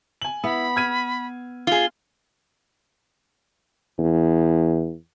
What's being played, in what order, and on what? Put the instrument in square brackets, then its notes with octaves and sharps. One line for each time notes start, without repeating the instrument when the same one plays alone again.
[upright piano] G#5 F#7
[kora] B3 [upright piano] E4 [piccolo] B5
[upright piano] F6 G#6 D#7
[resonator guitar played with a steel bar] F4 G#4 [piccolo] G7
[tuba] E2